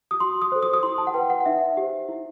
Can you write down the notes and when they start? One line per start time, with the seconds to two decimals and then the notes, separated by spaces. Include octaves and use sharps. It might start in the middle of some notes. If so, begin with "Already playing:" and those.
0.11 D#6
0.20 F#4 C6
0.42 D#6
0.52 A4 C5
0.63 D#6
0.74 D#6
0.83 E4 C6
0.98 A5
1.07 F#5
1.14 B4 G5
1.30 F#5
1.40 F#5
1.46 D#4 E5
1.77 G4 C5
2.09 E4